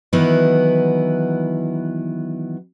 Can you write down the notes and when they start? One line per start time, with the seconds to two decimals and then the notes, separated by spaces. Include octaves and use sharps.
0.13 D#3 E3 F#3 B3 E4